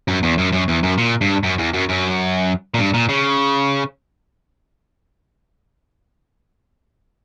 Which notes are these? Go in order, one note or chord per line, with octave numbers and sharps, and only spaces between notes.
F#2
E2
F#2
F#2
E2
F#2
A#2
G2
F#2
E2
F#2
F#2
A#2
G2
A#2
C#3